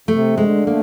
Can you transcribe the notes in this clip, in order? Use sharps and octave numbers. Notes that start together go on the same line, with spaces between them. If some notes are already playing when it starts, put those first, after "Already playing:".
C3 A3
D3 G#3
A3 A#3